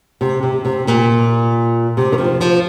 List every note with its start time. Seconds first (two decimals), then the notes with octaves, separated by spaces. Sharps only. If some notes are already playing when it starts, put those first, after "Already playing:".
0.21 C3
0.43 C3
0.65 C3
0.87 A#2
1.97 C3
2.12 D#3
2.18 F3
2.41 F3